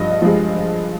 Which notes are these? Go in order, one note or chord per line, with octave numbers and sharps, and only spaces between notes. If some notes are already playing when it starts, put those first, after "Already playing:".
Already playing: G2 F3 D#5
F3 G#3